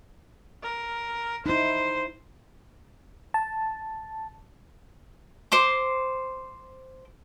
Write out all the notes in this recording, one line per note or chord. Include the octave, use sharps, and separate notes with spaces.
A#4
D#4 E4 C5
A5
C5 C6 D6